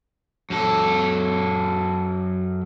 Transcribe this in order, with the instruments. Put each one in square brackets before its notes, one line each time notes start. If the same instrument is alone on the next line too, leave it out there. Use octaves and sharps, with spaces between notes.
[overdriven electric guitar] F#2 A4